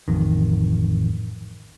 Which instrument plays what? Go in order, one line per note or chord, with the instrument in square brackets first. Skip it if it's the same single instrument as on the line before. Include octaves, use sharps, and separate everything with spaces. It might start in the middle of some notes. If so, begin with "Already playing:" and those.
[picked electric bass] A1 F2 D#3